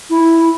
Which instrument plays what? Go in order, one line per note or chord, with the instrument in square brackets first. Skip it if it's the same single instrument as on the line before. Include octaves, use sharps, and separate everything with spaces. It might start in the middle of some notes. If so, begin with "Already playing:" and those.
[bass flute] E4